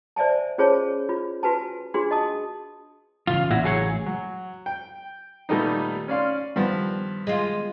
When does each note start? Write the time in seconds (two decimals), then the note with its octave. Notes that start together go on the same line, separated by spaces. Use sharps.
0.16 C5 D5 E5 G#5 A5
0.58 C#4 F4 G#4 C5 C#5 A5
1.09 F4
1.43 F4 F#4 B4 G#5 A5
1.94 D4 F4 F#4 G#4 C6
2.11 D#5 A5 D#6
3.27 A1 C#3 E3 F4
3.50 A#2 E4 F#4
3.64 F#3 G#4 C#5
4.06 F#3
4.66 G5
5.49 A#2 D#3 G3 A3 B3 D#4
6.08 C#4 D5 F5 C6
6.56 G2 D#3 F3 G3 B3
7.27 G#3 F4